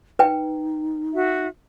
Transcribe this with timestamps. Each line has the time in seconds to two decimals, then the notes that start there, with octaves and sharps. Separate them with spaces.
0.19 D#4 B4 G5
1.14 F#4 E5